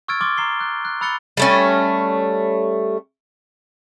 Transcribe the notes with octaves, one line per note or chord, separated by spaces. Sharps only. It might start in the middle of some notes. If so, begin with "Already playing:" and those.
C#6 E6 F6 G#6 A6 D7
C6 D6 F6 A6 G7
A#5 C7 G7
F#6
F#6
B5 E6 F#6 A6 C#7 G7
G3 A3 C#4